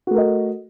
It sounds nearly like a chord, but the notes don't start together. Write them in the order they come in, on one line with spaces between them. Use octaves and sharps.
F#4 A3 A#4 D#5